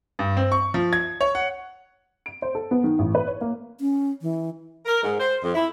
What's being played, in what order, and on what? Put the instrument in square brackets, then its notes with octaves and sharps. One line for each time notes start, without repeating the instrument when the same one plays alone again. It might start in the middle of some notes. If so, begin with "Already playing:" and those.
[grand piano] G2
C4
C#6
F3
G#6
C#5
F#5
[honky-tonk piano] D7
C5
A4
B3
D#3
A1
B4
C#5
A#3
[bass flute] C#4
E3
[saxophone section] A#4
G#2
C5
F2
E4